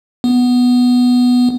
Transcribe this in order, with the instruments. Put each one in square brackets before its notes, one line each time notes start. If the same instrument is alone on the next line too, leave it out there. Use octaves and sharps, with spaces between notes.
[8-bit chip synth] B3